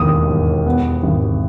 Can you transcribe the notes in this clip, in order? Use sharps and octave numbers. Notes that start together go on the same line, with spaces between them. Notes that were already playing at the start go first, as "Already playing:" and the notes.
Already playing: E1 D#2 D#3 D#6
E1
B3
G#1